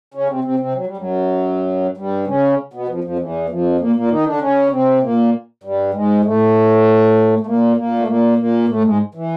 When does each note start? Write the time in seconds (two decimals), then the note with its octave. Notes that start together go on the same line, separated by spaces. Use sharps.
0.14 C#3 C#4
0.29 C3 C4
0.44 C3 C4
0.59 C3 C4
0.74 F#3
0.86 G3
0.97 F#2 F#3
1.97 G2 G3
2.27 C#3 C#4
2.73 B2 B3
2.88 F2 F3
3.04 F2 F3
3.19 E2 E3
3.49 F2 F3
3.80 A#2 A#3
3.96 A#2 A#3
4.11 D#3 D#4
4.26 D3 D4
4.41 C#3 C#4
4.71 C3 C4
5.03 A#2 A#3
5.63 G2 G3
5.94 G#2 G#3
6.24 A2 A3
7.40 A3
7.46 A#2 A#3
7.76 A#2 A#3
7.99 A3
8.07 A#2 A#3
8.37 A#2 A#3
8.68 A2 A3
8.84 G#2 G#3
9.15 E3